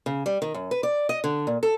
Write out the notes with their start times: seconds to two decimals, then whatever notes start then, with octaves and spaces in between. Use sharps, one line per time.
0.06 C#3
0.26 G3
0.42 D#3
0.54 F#2
0.71 B4
0.83 D5
1.09 D#5
1.24 D3
1.47 A#2
1.63 A4